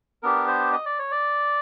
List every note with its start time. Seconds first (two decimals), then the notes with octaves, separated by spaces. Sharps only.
0.23 B3 D4 G4 A#4
0.48 C5
0.72 D#5
0.86 D5
0.99 C#5
1.11 D5